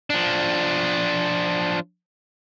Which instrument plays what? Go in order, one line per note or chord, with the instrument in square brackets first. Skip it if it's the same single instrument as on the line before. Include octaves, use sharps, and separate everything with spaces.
[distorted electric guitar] F3 D4